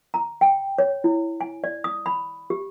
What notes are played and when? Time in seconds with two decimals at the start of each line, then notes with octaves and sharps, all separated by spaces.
0.14 A#5
0.41 G5
0.78 C#5
1.04 E4
1.41 G#5
1.64 D5
1.84 D#6
2.06 B5
2.50 G4